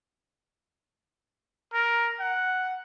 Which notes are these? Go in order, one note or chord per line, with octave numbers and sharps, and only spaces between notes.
A#4
F#5